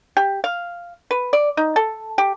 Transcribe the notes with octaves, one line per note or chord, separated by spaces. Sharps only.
G4
F5
B4
D5
D#4
A4
G4